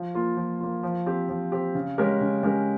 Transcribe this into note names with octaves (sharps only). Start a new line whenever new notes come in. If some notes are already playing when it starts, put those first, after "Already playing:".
Already playing: F3
A#3 F4
F3
A#3 F4
F3
C4 G4
F3
C4 G4
C#3
G#3 C#4 G4 A#4
C#3
G#3 C#4 G4 A#4